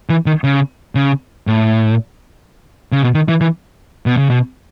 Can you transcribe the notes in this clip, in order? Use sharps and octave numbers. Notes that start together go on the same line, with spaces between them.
E3
D#3
C#3
C#3
A2
C#3
B2
D#3
E3
E3
B2
C#3
B2